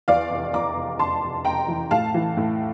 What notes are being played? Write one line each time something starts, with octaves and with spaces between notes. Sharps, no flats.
E2 D5 F5
F1
E2 A#5 D6
F1
F1 A5 C6
F1
F1 G5 A#5
E3
A2 F5 A5
E3
A2